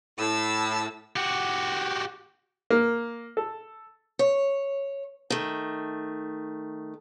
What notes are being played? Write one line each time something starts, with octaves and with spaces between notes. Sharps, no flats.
A2 A5 E6
F#4 G4
A#3
A4
C#5
D#3 A3